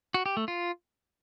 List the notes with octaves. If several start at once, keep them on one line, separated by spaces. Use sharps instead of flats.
F#4
G4
A3
F4